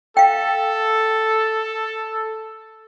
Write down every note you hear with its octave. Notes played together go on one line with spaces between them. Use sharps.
A4 F5 G5